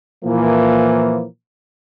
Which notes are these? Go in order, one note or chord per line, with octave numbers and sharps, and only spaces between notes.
A#2 E3 F3 A#3